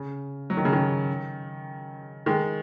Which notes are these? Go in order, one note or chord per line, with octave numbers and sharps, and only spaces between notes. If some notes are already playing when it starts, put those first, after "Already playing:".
Already playing: C#3
F#3
D#3
C#3
D#3
D#3 G#3